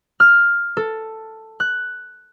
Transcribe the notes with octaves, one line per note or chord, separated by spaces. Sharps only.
F6
A4
F#6